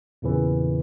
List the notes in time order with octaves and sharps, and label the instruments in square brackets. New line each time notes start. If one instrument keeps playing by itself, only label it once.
[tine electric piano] E2 A#2 C#3 E3